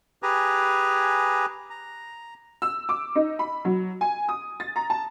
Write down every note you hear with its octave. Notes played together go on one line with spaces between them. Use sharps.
G4 G#4 B4 G#5 A#5
A#5
E6
D6
D#4
B5
F#3
G#5
D#6
A6
A#5
A5